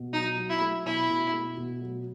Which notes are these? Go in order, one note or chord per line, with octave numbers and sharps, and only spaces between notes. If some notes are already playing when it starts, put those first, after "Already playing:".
Already playing: B2
F#3 D#4
F#3
E4
A3
B2 E4
B2
A3
B2
F#3